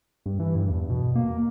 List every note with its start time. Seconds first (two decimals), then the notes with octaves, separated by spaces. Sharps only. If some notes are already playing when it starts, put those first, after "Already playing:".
0.26 G2
0.40 E3
0.55 G2
0.70 E2
0.90 B2
1.16 A#3